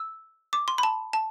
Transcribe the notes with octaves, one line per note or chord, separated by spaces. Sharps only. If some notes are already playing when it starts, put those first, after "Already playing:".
Already playing: E6
D6
C6
B5
A5
A5